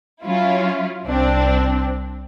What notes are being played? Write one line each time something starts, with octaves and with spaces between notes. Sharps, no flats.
F#3 C#4 E4 F4
C2 C4 D4